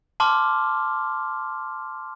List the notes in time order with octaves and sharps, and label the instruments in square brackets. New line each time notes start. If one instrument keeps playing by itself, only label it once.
[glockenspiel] A5 C6 D6 F6